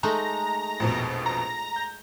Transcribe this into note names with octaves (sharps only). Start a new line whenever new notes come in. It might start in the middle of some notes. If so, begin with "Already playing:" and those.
G#3 A3 D#4 A#5
A#1 F2 B2
A#5
G6